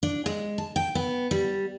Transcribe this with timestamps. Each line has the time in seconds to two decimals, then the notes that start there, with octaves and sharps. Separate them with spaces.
0.03 D4
0.26 G#3
0.58 A5
0.76 G5
0.95 B3
1.31 G3